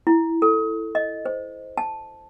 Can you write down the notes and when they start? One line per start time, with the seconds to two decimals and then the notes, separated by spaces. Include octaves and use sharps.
0.07 E4
0.42 A4
0.95 D#5
1.25 C5
1.78 A5